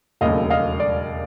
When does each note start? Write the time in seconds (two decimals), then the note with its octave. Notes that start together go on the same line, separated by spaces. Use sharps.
0.21 E1 D#2 C#3 F#3 A3 D#5 F5
0.50 D#5 F5
0.80 D5